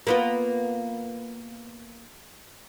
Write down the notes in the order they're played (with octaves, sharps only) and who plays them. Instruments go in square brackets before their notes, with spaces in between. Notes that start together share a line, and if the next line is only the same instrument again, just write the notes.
[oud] A#3 B3 F4